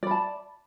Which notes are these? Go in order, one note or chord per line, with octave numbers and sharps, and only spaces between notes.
D5 A5 B5